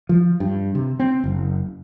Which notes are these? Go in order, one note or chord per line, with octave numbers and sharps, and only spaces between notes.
F3
G2
C3
C4
F#1